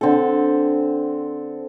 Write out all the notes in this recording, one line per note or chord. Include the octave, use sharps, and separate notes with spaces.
D3 C4 A4